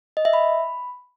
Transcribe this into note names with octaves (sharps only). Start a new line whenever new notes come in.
D#5
E5
B5